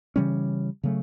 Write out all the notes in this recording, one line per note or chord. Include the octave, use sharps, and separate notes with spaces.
C#3 E3 G3 C#4
C#3 F#3 A3